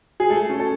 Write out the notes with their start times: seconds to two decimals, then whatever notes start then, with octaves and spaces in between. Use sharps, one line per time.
0.20 G#4
0.30 A3 A4
0.50 C#4
0.60 A4